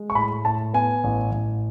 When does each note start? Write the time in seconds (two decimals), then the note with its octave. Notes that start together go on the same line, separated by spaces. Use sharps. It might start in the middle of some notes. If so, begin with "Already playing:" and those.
Already playing: G#3
0.10 C#6
0.15 A2 B5
0.45 A2 A5
0.73 B3 G#5
1.04 A1
1.32 A1